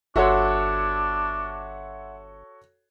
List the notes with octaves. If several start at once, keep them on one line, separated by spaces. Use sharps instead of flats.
G1 D4 F#4 A4 C#5 E5 F#5 C6